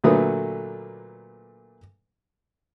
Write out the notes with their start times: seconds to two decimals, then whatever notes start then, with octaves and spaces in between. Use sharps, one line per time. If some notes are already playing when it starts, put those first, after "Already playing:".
0.04 A#2 D3 F#3 A3 B4 D#6